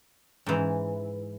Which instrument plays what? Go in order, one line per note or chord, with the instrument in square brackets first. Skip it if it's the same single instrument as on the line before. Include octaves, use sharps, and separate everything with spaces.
[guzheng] G#2 E3